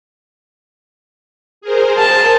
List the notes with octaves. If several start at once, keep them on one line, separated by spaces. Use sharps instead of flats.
G#4 A#4 C5
A5